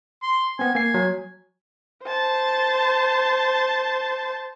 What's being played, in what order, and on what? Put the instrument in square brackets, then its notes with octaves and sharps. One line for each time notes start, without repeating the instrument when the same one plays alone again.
[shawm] C6
[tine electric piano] B3 C4 [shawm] G#5
[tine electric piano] A#3 C7 [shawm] G#5
[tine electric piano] F#3
[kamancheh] C5 A5